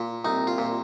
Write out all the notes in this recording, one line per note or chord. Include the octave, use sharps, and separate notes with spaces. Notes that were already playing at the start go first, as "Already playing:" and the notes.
Already playing: A#2
C2 D#4
F4
A#2